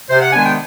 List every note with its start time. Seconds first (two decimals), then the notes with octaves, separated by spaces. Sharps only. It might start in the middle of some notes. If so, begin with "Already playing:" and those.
0.10 C3 C5
0.21 F#5
0.33 D#3 G#3 B3 D4 G#5
0.45 G5